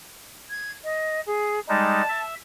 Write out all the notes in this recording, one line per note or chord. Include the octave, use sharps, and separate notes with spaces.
G#6
D#5
G#4
G3 G#3 D#4 A5
E5